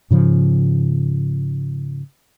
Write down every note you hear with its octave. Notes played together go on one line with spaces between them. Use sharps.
G#2 C#3 F3